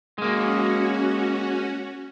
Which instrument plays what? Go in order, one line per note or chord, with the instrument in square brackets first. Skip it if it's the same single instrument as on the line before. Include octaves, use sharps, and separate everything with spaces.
[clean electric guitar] G#3 A#3 [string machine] C#4 F#4